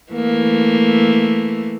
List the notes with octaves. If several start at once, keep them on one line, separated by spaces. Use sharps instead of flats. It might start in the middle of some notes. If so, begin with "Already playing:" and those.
E3 A3 A#3